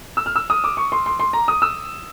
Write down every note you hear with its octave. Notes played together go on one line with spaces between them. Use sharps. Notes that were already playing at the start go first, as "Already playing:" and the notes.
E6
F6
E6
D#6
D6
C#6
C6
C6
C6
A#5
D#6
E6